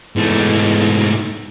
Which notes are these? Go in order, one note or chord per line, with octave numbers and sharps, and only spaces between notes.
E2 G#2 A3